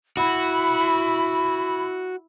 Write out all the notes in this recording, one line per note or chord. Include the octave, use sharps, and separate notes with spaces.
E4 F#4 B5